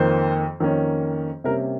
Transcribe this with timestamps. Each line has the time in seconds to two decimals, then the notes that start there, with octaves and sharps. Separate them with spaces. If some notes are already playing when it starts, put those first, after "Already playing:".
Already playing: F2 D#3 A#3 C5
0.60 F2 D#3 A#3 C#4
1.44 C3 G3 A#3 C#4 A#4